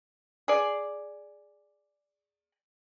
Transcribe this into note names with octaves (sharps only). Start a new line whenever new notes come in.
G#4 D5